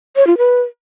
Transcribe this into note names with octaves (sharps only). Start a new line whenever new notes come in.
C#5
F4
B4